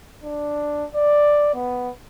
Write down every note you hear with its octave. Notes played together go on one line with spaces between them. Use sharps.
D4
D5
B3